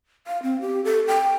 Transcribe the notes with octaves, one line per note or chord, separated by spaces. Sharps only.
F5
C4
G4
A4
G5